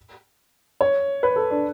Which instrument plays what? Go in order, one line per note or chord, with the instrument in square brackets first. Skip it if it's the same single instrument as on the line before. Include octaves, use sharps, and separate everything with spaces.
[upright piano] C#5
B4
A4
D4